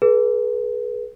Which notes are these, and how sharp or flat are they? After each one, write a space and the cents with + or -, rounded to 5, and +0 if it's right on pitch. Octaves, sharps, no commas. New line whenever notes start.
G#4 +35 B4 -25